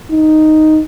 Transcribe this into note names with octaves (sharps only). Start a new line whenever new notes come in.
D#4